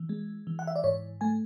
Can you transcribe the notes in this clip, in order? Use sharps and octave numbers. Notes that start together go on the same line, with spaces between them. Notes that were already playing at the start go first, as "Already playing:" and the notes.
Already playing: E3
G#3
E3
F#5
E5
D5
G#2 C#5
A3 G#5